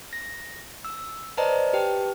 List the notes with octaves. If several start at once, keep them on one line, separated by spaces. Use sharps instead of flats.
A#6
E6
B4 C5 D5 D#5 A5 A#5
G4 B4 G5 A5